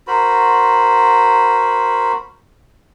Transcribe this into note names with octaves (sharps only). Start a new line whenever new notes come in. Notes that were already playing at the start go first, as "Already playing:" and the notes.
F#4 A#4 C5 B5